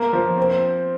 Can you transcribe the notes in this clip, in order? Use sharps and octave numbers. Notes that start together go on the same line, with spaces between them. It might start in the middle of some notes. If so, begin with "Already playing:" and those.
Already playing: A#3
F3
C4